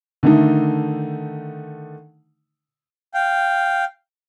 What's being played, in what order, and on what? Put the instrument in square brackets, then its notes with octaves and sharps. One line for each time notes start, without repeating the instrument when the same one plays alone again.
[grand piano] D3 D#3 A3 D#4
[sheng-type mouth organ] F5 G5